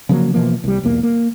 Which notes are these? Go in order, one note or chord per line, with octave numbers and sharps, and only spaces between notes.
C#3 F3 F#3 A#3
B2 E3 F3 A#3
C2 G3
B1 E2 A#3
A#3